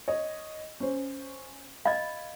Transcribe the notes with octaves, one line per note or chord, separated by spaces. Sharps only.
C#5 D#5
C#4 C5
D#5 F5 B5 G#6